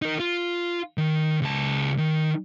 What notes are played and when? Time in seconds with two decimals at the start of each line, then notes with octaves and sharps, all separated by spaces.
0.02 D#4 A#4
0.20 F4
0.98 D#3
1.42 C#2 A5
1.98 D#3